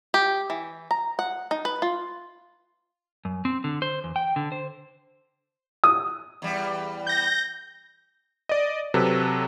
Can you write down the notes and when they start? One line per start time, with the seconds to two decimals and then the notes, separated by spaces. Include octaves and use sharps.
0.14 G4
0.50 E3
0.91 A#5
1.19 F#5
1.51 D#4
1.65 B4
1.82 F4
3.25 F#2
3.45 C4
3.64 D3
3.82 C5
4.04 E2
4.16 G5
4.36 D3
4.52 C5
5.84 D#6
6.42 E2 G3
7.07 G6 A#6
8.49 D5 D#5
8.94 C3 F#3 A4 B4